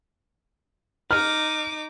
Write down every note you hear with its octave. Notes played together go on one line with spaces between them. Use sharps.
D#4 D6 F6